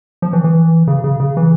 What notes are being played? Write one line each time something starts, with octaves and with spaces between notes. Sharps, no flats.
F3
E3
E3
C#3
C#3
C#3
E3